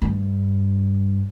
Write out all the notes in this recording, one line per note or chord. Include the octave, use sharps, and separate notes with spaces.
G2